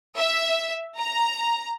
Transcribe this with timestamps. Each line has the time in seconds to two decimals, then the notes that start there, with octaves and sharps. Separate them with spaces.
0.16 E5
0.98 A#5